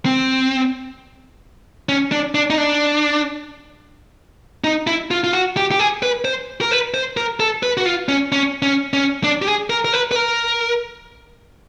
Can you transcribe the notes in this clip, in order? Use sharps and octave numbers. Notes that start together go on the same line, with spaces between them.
C4
C#4
D4
D4
D#4
D4
D#4
E4
F4
F4
F#4
G4
G4
G#4
B4
C5
A#4
B4
C5
A#4
A4
B4
F#4
F4
C#4
C#4
C#4
C#4
D4
G4
G#4
A#4
A#4
B4
B4
A#4